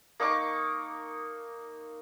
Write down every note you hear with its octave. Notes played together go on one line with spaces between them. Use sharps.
A#3 D#4 C#6 D6